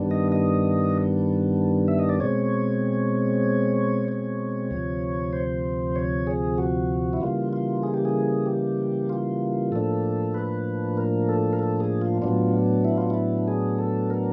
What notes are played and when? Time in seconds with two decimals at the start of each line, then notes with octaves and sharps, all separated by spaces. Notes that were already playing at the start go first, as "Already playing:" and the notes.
Already playing: G2 D#3 G3 B3 D4
0.11 D#5
0.32 D#5
1.88 E5
1.99 D#5
2.09 D5
2.20 B2 G#3 C4 C#5
4.08 C#5
4.71 D2 C3 F3
5.33 C5
5.96 C#5
6.27 G#4
6.58 F#4
7.13 E4
7.20 C#3 E3 G3 A#3 F4
7.53 F4
7.83 G#4
7.94 G4
8.05 G#4
8.46 G4
9.09 F4
9.72 A2 F3 A#3 D4 A4
10.34 B4
10.97 A#4
11.29 A4
11.53 A#4
11.59 A4
11.80 G#4
12.02 F4
12.22 A2 F#3 B3 D4 F4
12.85 E4
12.98 F4
13.10 E4
13.48 G#4
13.79 A4
14.10 A#4